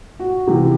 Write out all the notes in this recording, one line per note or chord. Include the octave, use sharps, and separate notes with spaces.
F#4
C3 E3 G4